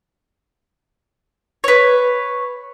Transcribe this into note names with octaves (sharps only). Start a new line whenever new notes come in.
B4 C#5